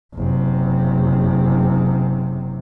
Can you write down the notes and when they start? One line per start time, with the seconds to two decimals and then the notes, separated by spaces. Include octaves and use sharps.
0.15 F#1 C3